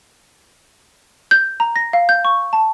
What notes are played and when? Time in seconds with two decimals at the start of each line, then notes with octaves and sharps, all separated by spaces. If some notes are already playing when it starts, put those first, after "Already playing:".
1.31 G6
1.60 A#5
1.76 A#6
1.93 F5
2.09 G6
2.25 C#6
2.53 A5